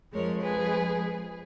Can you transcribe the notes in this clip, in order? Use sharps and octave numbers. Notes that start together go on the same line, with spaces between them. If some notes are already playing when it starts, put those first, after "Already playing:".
F2 F3 G#3 A#4 C#5
G#4 B4